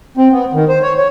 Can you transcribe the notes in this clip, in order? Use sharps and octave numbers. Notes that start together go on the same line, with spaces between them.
C4
B3
D#3
C5
C#5
C#5